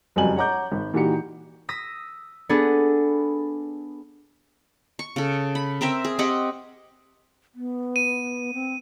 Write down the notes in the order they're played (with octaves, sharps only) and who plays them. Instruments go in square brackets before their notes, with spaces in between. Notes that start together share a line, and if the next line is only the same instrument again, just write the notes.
[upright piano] F#1 F2 F#3 G3 G#5 F#7
C#5 F#5 A#5 D6 G6
G#1
A#2 E3 D#4 F#4 G4 C#7
[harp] D#6 E6 A#6 B6
B3 D4 G#4 A4 B4
[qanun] C#6
C#3 A4
B5
C4 A#4 E5 G5
G#4
C4 G4 D#5 F#5
[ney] B3
[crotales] D#7
[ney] C4